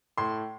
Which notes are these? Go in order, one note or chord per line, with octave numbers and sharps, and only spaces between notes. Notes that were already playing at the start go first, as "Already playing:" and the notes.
A2 C6